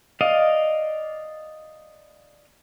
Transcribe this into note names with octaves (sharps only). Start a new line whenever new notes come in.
D5 D#5 F5